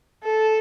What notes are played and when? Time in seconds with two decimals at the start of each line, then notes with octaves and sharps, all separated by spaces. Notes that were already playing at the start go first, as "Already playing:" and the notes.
0.24 A4